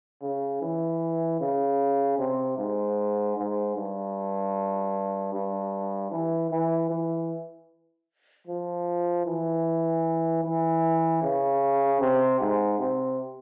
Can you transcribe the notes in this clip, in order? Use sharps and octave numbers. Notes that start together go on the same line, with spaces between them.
C#3
E3
C#3
C3
G#2
G#2
G2
G2
E3
E3
E3
F3
E3
E3
C#3
C3
G#2
C3